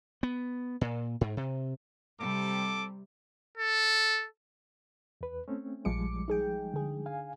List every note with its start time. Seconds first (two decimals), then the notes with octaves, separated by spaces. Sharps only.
0.23 B3
0.81 A#2
1.21 G#2
1.37 C3
2.20 C3 G3 A4 D6
3.58 A4
5.21 E2 B4
5.48 A3 C4 C#4
5.85 A#1 F3 G3 G#3 D6 C#7
6.28 D#4 G#4 G5
6.74 D3 G#4
7.06 F5 G#5